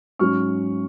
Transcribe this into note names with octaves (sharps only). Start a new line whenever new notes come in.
G#2 F#3 C#4 C#6 F6